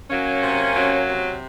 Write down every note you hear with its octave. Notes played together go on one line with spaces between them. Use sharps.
F#3 A#3 C#4
C3
F#3
C3